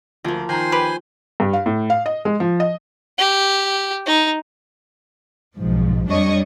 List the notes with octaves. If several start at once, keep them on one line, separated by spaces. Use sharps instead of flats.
D2 F3 A#3
D#3 C5 G#5 A#5 C6
G4 B4
G2
F5
A2
F5
D#5
G#3
F3
D#5
G4
D#4
B1 G#2 F3
F2 G3 D4 C#5 D#5 C#6